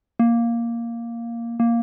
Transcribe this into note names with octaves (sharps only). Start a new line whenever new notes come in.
A#3
A#3